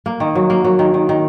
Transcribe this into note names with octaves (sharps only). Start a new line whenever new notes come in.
A#3
D#3
F#3
A#3
F#3
D#3
D#3
D#3